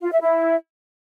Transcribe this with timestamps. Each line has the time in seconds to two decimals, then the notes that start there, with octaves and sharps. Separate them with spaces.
0.02 F4
0.12 E5
0.21 E4